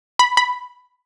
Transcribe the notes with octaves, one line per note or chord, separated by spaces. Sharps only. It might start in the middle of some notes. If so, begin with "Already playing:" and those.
B5
B5